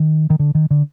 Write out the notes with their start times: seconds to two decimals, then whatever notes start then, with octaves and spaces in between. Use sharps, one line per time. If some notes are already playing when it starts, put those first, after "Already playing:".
Already playing: D#3
0.30 D#3
0.39 D3
0.55 D#3
0.71 D3